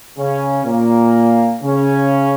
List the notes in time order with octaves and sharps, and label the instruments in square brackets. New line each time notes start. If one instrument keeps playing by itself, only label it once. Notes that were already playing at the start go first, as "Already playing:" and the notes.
[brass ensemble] C#3 C#4
A#2 A#3
C#3 C#4